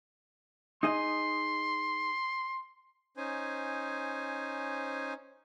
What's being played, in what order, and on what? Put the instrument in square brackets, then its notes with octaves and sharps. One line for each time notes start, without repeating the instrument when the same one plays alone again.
[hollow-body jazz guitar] D#4 G#4 D#5 [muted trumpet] C6
[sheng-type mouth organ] C#4 D#4 C5 G#5